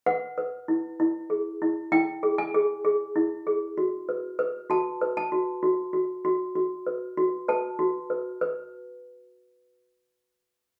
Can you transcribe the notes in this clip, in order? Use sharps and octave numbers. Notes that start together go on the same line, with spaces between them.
B4 F#5
B4
E4
E4
G#4
E4
E4 G5
G#4
G#5
G#4
G#4
E4
G#4
F#4
B4
B4
F#4 A5
B4
A5
F#4
F#4
F#4
F#4
F#4
B4
F#4
B4 A5
F#4
B4
B4